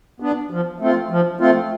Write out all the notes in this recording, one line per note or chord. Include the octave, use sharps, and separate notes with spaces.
B3 D4
F3
A3 C4 F4
F3
A3 C4 F4